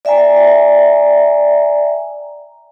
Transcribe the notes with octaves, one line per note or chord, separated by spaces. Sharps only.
D5 E5 G5 G#5 A#5